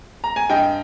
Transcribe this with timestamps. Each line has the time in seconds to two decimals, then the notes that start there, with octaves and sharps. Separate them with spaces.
0.24 A#5
0.36 G#5
0.49 G2 D#5 G5